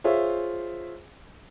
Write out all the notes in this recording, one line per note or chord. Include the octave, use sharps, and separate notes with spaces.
F4 G#4 C5 C#5 E5